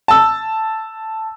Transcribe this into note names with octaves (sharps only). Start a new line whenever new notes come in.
A5 E6